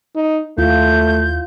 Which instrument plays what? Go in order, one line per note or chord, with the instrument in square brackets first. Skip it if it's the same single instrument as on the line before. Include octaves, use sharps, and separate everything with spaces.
[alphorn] D#4
[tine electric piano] D#2 [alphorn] A3 [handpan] E4 F4 [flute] G6